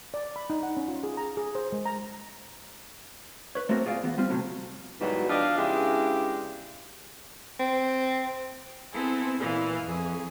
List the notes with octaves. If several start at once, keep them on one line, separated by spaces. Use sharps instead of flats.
D5
B5
D#4
F#5
C#4
F4
G#4
A#5
G#4
C5
G#3
A#5
B4 C#5
A3 A#3 C4 F#4 A#4
F4 G#4 D5 F5
E3 B3
G3 C4 F4
A2 C3 F#3
G#2 B2 D#3 E3 F#3 G3
F3 D4 G4 D#5 F5
C#3 G#3 B3 D4 E4 G4
C4
B3 C4 E4 G#4 A4
A#2 E3 B4 F5
F2 G#4